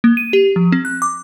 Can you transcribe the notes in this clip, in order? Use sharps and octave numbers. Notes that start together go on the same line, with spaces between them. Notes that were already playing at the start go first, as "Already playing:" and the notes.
A#3
D#7
G4
F3
C4
F#6
D6